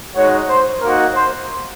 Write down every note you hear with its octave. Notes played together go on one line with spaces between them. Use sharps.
G#3 D#4 F#4 C#5
C5
A#3 D#4 F#4 A#4
C5